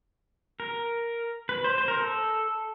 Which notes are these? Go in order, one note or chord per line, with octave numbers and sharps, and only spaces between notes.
A#4
B4
C5
C5
A#4
A4